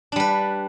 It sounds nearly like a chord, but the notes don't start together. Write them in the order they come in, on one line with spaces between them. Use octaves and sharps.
D4 G3 B4